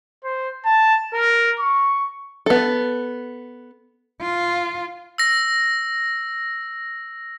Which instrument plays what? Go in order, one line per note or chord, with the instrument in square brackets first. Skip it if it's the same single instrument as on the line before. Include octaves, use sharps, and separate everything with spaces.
[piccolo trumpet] C5
A5
A#4
C#6
[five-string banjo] B3 A4
[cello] F4
[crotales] E6 A#6